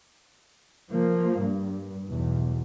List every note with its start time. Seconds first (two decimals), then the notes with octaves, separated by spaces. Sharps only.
0.90 F3 A#3
1.40 G2
2.08 B1 E2